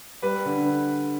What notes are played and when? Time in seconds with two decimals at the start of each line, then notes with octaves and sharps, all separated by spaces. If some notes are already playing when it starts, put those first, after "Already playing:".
0.22 G3 B4 B5
0.45 D3